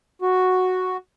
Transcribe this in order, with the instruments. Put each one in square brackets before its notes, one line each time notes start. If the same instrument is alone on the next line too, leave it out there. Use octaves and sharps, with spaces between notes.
[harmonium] F#4